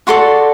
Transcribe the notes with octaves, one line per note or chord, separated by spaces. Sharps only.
F#4 A4 D5 C6